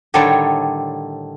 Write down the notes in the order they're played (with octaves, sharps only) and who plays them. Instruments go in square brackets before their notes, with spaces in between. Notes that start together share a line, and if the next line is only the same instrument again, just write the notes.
[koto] A2 D3 D#3 G3 A4 C#5